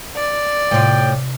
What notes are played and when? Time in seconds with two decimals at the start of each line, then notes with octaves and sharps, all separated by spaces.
0.15 D5
0.71 A2 C3 F4 G5